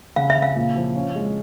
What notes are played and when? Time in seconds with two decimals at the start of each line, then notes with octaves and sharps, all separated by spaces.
0.16 C#3 F5
0.30 E5
0.36 C#3
0.42 F5
0.56 A#2
0.76 F3
0.96 C#4
1.15 G#3